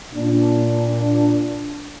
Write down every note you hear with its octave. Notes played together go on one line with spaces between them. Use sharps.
A#2 D4